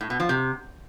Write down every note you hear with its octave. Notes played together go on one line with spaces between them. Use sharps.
A2
B2
F3
C3